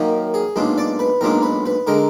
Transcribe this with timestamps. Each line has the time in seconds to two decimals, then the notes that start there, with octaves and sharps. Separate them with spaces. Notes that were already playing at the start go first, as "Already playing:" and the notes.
Already playing: F#2 D#3 A#3
0.34 G#4
0.56 B1 A#2 G#3 D4
0.78 D5
0.99 B4
1.21 B1 A#2 G#3 D4 A#4
1.43 B4
1.66 B4
1.87 D3 G#3 A#4